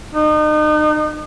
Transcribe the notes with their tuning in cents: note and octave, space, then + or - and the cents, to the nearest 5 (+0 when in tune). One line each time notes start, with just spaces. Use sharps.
D#4 -35